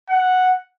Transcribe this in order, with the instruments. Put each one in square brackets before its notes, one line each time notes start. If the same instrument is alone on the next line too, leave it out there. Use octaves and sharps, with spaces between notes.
[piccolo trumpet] F#5